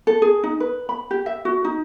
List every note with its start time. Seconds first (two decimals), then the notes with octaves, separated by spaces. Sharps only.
0.07 A4
0.22 G#4
0.44 D#4
0.60 B4
0.89 B5
1.11 G4
1.26 E5
1.45 F#4
1.64 D#4